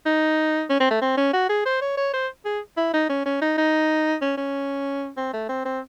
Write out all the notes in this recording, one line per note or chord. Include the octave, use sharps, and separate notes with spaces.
D#4
C#4
C4
A3
C4
C#4
F#4
G#4
C5
C#5
C#5
C5
G#4
E4
D#4
C#4
C#4
D#4
D#4
C#4
C#4
C4
A3
C4
C4